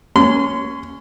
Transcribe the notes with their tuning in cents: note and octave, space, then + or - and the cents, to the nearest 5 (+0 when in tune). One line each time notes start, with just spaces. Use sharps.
C#4 +0 C6 -30